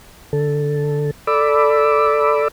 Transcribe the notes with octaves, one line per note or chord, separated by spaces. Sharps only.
D3 A4
A4 D5 B5 D6 E6